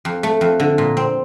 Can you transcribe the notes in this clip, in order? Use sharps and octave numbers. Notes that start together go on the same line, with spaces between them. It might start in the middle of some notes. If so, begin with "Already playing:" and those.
F2
A3
F2
D3
A#2
C4